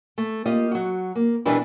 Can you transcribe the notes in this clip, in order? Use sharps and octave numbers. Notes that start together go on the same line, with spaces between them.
A3
A#3 F4 G4 D#5
F#3 F#4
A#3
B2 E3 G3 D4 A#4 B4